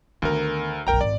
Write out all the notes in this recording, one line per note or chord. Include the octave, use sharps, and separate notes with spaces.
D2 D#3 B3 A#4
F#1 B1 A#4 G5 A#5
G#1 D5